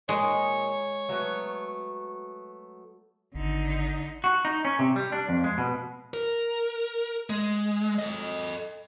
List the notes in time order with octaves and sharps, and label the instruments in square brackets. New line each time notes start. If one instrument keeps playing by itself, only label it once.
[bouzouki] A#2 D#5 [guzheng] G#3 [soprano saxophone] C#5
[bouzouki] F#3 A3 B3
[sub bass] G#1 [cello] D3 D#4
[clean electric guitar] F#4
D#4
C#4
C3
G3
D4
F2
G#3
B2
[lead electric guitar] A#4
G#3
A4 D#5